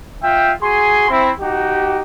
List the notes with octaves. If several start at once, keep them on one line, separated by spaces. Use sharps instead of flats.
F4 E5 G5
F#4 G#4 G#5 C6
C4 E4
D#4 F#4 G4